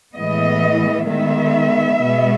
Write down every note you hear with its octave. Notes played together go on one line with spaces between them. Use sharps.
A2 E3 G#3 B3 D#5
D#3 G#3 B3 E5
B2 G#3 B3